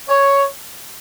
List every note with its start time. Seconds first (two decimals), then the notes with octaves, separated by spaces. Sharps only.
0.08 C#5